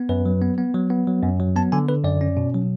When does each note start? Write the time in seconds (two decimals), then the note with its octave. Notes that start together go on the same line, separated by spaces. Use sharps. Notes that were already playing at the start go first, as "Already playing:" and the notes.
Already playing: B3
0.09 F#2 B4
0.26 F#3
0.41 B3
0.58 B3
0.74 F#3
0.90 B3
1.07 F#3
1.23 F#2
1.40 F#3
1.56 B3 A5
1.72 D3 G#5
1.89 D3 B4
2.04 F#2 D5
2.21 C#4
2.37 B2
2.54 F#3